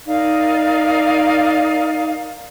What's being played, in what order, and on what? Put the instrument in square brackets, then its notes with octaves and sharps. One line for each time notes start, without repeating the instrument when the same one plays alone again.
[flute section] D#4 A#4 D5 F5